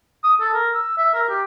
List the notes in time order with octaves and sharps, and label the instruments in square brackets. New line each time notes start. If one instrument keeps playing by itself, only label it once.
[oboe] D#6
A4
A#4
E6
E5
A#4
G4